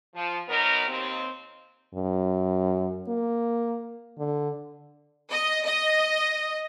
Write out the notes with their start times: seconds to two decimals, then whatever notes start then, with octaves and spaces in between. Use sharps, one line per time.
0.15 F3
0.49 E3 F#3 B3 D#4 A#4
0.87 D#2 C4
1.94 F#2
3.08 A#3
4.18 D3
5.30 D#5
5.65 D#5